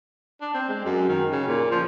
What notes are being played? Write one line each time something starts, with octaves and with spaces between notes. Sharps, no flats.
D4
C4
G#3
F#2
D#3
C#3
A#2
F3